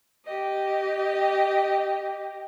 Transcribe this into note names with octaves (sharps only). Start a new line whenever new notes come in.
G4 D#5